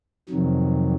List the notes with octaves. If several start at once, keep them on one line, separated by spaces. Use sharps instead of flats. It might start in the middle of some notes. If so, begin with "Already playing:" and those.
F2 C3 D#3 F#3